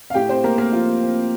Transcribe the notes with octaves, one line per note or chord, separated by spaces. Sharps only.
F5
A2 G4 G5
C4 C5
A2 A#3 A#4
A#3 A#4
F3 F4
C4